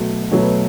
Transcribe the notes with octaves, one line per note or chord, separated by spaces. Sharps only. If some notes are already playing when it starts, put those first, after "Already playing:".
Already playing: B2 F#3 A3
B2 F#3 A3 C#5
B4